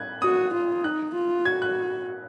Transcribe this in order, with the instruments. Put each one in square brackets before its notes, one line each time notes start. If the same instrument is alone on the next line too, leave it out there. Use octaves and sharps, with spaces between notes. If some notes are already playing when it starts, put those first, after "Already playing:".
Already playing: [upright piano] F#6 G#6
[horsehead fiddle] F#4 [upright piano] D#6
[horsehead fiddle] F4
[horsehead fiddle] D#4 [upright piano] F#6
[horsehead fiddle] F4
[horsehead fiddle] F#4 [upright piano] G#6
[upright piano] F#6